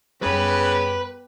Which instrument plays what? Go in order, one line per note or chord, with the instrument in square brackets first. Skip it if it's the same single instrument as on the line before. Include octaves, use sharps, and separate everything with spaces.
[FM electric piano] F#2 G3 [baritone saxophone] C#3 [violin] B3 G4 [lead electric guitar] B4 B5